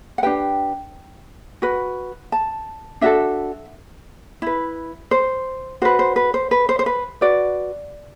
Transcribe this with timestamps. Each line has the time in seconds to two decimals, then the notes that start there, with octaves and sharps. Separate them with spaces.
0.18 F#5
0.23 D4 G4 B4 G5
1.62 F#4 B4
2.32 A5
3.01 D4 F#4 A4 E5
4.42 E4 B4
5.11 C5
5.82 F#4 B4 C5
5.99 C5
6.16 B4
6.34 C5
6.51 B4
6.69 C5
6.79 C5
6.86 B4
7.21 F#4 B4 D5